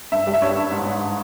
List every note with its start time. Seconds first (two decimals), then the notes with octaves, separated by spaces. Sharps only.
0.12 G2 E5
0.27 G3
0.34 E5
0.42 G2 C#5
0.57 G2
0.71 G#2
0.86 G#2